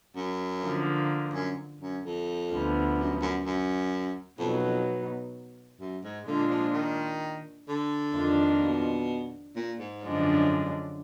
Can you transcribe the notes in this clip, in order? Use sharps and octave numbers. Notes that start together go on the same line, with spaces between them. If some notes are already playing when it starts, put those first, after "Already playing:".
F#2
D3 F3 A#3
F#2
F#2
F2
D2 D3 F3 B3
F#2
F#2
F#2
F2 B2 F#3 B3 D#4
F2
F#2
G#2
A#2 D3 G#3 D4 F4
F3
D#3
D3
F2 D#3 A#3 D4 F4
B2
A#2
G#2
F#2 D3 F3 G#3 D4